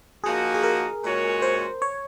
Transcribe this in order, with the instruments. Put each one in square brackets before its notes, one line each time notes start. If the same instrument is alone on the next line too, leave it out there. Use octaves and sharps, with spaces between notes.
[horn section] F3 A#3 D#4 F#4 [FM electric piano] G#4
[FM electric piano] G#4
A#4
[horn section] A#2 G#3 C#4 F#4 C#5
[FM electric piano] C5
C#5